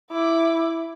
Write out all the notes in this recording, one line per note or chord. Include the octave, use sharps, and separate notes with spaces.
E4 D6